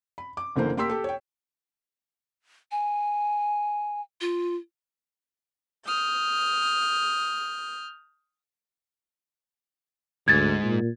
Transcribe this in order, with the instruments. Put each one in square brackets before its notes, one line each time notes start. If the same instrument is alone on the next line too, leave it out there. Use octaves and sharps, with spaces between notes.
[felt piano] B5
D6
F#1 D3 E3 A#3 C5
A#3 G4 C6 E6 B6
G4 A4
C#5 G5
[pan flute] G#5
F4
[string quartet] D#6 F6 G6
[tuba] D2 [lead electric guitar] G#2 [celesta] G#6 A6
[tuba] A#2